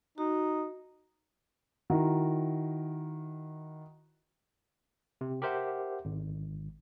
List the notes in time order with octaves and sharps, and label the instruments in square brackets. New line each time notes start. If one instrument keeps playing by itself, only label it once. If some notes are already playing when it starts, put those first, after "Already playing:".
[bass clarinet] D#4 [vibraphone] F#4
[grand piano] D#3 E4 F#4 A#5
[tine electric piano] C3
G4 A#4 C5 E5 F#5
G#1